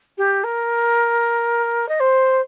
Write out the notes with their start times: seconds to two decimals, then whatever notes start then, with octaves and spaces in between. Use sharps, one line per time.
0.17 G4
0.43 A#4
1.88 D#5
2.00 C5